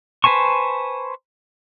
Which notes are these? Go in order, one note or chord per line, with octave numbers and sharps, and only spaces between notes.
B4 C5 G#5 A5 C#6